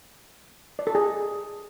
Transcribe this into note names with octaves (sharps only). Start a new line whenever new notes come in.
D5
A4
G#4